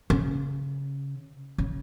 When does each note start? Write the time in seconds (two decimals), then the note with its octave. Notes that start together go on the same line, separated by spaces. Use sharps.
0.10 C#3
1.58 C#3